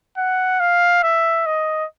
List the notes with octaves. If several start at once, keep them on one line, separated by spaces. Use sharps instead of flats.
F#5
F5
E5
D#5